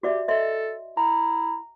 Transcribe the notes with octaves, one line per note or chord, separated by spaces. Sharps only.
F#4 G4 D5 E5
A4 D#5 E5 C6
E4 A#5